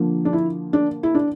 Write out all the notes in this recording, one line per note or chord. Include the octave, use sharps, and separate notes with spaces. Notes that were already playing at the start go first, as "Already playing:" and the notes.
Already playing: D3 F3 A#3
D4
E4
D4
E4
D4